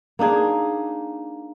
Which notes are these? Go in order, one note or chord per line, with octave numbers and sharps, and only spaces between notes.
A#3 D4 D#4 G#4